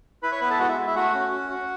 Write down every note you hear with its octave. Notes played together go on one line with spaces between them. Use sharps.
E4 B4 B5
C#5 C#6
B3 B4 B5
A4 A5
G#3 F#4 F#5
E4 E5
G#3
E4 E5
A3 F#4 F#5
C#4
F#4
F#4